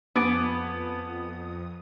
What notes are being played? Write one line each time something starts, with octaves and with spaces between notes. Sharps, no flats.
F2 B3 G#5 A5 D6 D#6